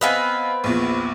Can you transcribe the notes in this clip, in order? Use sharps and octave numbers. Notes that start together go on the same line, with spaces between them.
B3 C4 B4 D#5 F5 G#5
A#1 E2 A#2